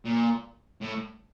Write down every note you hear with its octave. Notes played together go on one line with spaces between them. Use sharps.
A#2
A2